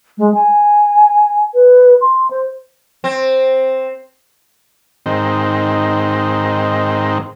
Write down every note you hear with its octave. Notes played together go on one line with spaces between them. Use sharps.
G#3
G#5
B4
C6
C5
C4
G#2 D#3 C4